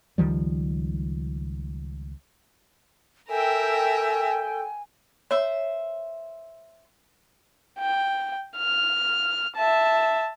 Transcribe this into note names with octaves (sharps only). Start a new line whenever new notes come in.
C#2 D#3 F3 G3
A4 A#4 E5 G5 G#5
C5 C#5 E5
G5
F6
E5 A5